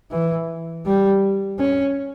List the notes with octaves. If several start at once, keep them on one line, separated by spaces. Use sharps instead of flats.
E3
G3
C#4